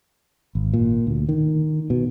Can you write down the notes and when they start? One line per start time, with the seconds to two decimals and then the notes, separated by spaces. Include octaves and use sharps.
0.55 G#1
0.73 A#2
1.07 D2
1.29 D#3
1.90 B2